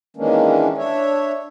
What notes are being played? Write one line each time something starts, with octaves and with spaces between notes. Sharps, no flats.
D#3 E3 G#3 A#3 C#4 D4
D4 C#5 E5